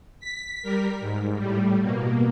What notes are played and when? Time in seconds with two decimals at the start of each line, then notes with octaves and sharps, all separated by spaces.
0.20 B6
0.62 G3 A#4
1.00 G#2
1.37 A2 G3
1.81 B2 A#3